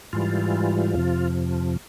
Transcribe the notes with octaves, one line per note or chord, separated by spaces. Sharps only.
G#2 E3 G3 F4
F2 C3 F3